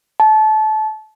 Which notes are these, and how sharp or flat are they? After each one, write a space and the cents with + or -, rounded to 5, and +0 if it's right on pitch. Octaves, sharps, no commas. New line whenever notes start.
A5 -25